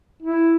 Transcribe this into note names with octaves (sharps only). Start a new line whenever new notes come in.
E4